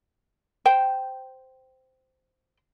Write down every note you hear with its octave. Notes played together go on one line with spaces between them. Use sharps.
C5 G5